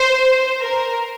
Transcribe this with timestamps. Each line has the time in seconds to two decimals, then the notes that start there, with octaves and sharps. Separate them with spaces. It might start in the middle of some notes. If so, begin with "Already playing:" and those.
Already playing: C5
0.62 A#4